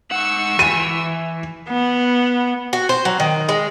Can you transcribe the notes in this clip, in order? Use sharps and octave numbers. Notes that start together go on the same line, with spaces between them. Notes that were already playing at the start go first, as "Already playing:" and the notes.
G#2 F#5 C#6 E6
E3 G#5 D#7
B3
F#4
C5
F#3
D#3
G#3